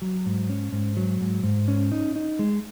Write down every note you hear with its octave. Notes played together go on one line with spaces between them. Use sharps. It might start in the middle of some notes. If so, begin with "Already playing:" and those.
F#3
G#2
C#4
G#2
F#3
G#2
G#2
C#4
D#4
D#4
G#3